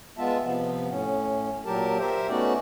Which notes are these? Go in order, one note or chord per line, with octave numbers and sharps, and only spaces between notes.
G#3 B3 F4 E5 A5
C3 F3 B3
A2 C#4
A#2 F#3 G4 A#4 A5
G4 A#4 C5 E5
A3 B3 C#4 D#4 F#4 D5